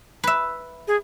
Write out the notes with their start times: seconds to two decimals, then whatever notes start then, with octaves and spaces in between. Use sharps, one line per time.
0.24 B4 E5
0.88 G#4